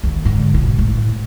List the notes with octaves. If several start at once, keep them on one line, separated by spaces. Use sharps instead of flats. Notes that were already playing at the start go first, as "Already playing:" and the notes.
D#2
G#2 D3
B2
A2